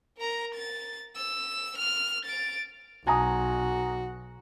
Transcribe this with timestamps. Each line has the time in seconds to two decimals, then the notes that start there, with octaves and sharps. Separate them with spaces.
0.18 A#4 A#5
0.55 A6
1.16 E6
1.78 F6
2.25 A6 D7
3.07 B1 F#4 G#5 A#5 D#6